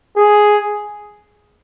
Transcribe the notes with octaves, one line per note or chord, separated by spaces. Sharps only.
G#4